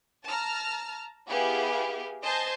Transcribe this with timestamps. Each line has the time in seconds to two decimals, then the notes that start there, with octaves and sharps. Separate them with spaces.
0.25 A5 A#5 F6
1.28 B3 E4 G4 G#4 F5
2.22 C5 D#5 G#5 A5 G6 C7